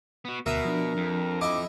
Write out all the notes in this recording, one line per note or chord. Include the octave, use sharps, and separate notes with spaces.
B3 F#4
D2 B2 A#4 E5 D#6
F3 D4
F2
E4 D#5 D6